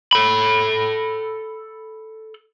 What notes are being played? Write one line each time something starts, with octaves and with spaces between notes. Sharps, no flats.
A4 B5